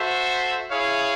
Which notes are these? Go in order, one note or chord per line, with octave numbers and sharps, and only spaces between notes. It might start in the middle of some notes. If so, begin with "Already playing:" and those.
Already playing: F#4 A4 C5 E5
E4 G#4 C#5 F5